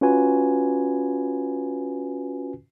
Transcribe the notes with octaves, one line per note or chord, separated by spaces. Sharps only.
C#4 F4 F#4 B4 G#5